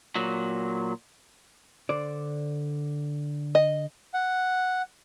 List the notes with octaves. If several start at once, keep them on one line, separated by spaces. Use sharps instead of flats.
A#2 F#3
D3 C5 D5
D#5
F#5